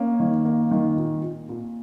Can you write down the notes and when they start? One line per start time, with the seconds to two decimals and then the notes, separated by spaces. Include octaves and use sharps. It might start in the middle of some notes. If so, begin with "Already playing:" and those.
Already playing: A#3 C#4
0.20 D#3
0.45 A#3
0.71 D#3
0.97 A#2
1.23 A#2
1.49 A#2